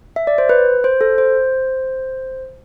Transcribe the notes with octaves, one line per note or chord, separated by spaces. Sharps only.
E5
D5
C5
B4
C5
A4
C5